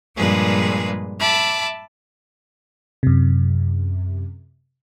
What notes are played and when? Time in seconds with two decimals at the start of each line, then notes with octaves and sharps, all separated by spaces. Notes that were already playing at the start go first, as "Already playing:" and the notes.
0.15 G2 A#2 F3 G#3 G#4 B4
1.19 E5 A5 B5 D6
3.03 F#2 C3